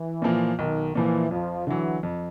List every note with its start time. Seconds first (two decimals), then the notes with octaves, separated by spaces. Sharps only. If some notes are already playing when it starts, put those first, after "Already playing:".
Already playing: E3
0.22 A#2 F3 A#3
0.58 B1 D#3
0.95 A#2 E3 F3 A#3
1.31 F2 F3
1.67 D3 E3 F#3
2.03 F2